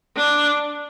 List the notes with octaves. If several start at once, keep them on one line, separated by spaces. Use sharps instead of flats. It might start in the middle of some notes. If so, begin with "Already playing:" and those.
D4